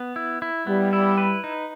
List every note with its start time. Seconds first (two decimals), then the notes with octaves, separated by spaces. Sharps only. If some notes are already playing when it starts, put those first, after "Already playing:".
Already playing: B3
0.16 E4
0.42 E4
0.67 G3 B3
0.93 E4
1.18 B4
1.44 D#4